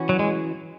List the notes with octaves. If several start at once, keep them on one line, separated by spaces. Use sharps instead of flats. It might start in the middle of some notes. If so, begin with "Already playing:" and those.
Already playing: E3 C#4 F#4
F#3
G#3